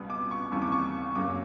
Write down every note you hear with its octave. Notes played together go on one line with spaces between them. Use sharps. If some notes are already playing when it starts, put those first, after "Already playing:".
Already playing: C#2 B2 G3 B3
D6
C#6
D#2 C#3 E3 G3 C4 C#6
D6
C#6
F#2 C#3 F#3 A#3 D6